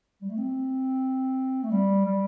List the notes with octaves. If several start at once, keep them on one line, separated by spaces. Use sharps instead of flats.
G3
A3
C4
A3
G3
G3